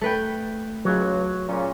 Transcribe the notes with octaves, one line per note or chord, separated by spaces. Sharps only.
A3 B4 G5
C#2 F#3
A#2 C#3 C#4